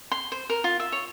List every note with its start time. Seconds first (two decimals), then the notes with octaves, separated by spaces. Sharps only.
0.12 C6
0.32 C5
0.50 A#4
0.64 F4
0.80 E5
0.92 C#5